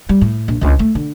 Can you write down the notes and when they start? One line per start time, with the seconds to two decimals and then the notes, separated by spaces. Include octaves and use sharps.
0.09 G3
0.21 A2
0.48 A#1
0.61 C#2 D3
0.79 A3
0.95 D3